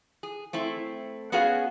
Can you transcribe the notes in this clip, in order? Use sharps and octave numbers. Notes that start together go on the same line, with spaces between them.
G#4
A3 C4 E4
B3 C#4 F#4 G#4 F5